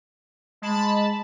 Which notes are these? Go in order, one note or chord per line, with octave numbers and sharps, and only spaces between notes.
G#3 A5 B5